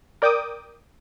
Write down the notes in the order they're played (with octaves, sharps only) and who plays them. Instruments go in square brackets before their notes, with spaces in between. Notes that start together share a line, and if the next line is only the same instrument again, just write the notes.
[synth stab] A#4 D5 G5 D6 D#6